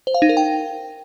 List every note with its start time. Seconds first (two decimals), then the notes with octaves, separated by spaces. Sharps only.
0.07 C5
0.14 F5
0.22 D#4
0.29 A#4
0.37 G5